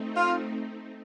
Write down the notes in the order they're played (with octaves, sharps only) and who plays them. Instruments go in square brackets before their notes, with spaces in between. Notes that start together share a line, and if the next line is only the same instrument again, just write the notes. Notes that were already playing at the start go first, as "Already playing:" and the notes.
Already playing: [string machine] A3 C4 D#4
[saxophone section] F4